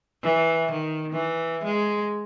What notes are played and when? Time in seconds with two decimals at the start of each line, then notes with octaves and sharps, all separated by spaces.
0.23 E3
0.72 D#3
1.12 E3
1.64 G#3